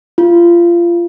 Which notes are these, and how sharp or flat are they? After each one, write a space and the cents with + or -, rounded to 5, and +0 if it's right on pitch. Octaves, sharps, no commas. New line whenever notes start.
F4 -25